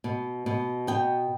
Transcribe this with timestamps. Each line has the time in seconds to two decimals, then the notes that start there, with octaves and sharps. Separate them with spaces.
0.04 B2
0.46 B2
0.87 B3 G5